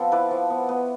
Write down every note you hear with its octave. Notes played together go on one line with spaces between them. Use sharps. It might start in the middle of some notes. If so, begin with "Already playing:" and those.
Already playing: F3 B3 C4 A4
E4 B4 D5
F3
B3
B3